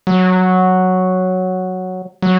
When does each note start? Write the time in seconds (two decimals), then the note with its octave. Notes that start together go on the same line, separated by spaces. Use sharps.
0.07 F#3
2.22 F#3